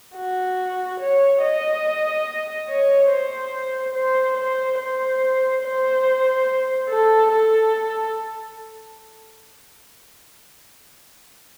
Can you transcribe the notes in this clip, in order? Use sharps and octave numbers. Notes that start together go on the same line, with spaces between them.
F#4
C#5
D#5
C#5
C5
C5
C5
C5
C5
A4
A4